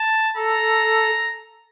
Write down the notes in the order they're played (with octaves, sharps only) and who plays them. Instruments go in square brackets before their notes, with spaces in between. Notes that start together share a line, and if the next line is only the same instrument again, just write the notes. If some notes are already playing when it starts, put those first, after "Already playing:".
Already playing: [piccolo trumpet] A5
[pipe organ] A4 [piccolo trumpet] A#5